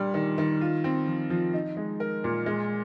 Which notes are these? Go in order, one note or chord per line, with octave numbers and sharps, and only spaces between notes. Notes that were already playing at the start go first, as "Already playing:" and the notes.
Already playing: A#2 G3 D4
D#3
D#3
F4
C4
F3
F3
D#4
G#3
A#4
A#2
G#3